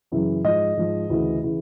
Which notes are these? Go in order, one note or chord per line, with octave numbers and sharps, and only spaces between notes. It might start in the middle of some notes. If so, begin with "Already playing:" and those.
F#2 C#3 E3
G#2 F3 D#5
G#2 F3
D2 C#3 E3
C#3 E3